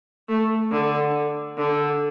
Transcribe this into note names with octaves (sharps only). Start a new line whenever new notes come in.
A3
D3
D3